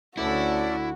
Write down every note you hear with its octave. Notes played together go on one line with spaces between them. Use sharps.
D2 D3 C#4 E4 F#4 A4 D5